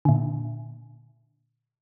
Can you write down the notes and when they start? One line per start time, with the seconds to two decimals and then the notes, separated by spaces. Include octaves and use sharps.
0.05 A#2 D3